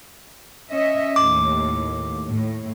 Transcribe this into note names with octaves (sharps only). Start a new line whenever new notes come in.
C#4 D#5 E5
D#2 A2 D6
A2